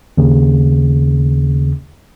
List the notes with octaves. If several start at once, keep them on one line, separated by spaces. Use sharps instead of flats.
D#2 C#3